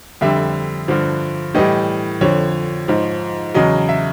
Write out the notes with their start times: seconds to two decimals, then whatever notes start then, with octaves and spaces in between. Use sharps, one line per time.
0.21 F2 D3 G3 E5
0.88 G2 D3 F3
1.55 A2 E3 G3 D#5
2.21 F2 D3 F3 C#5
2.88 G#2 F3
3.54 E2 C#3 F#3 D#5
3.89 E5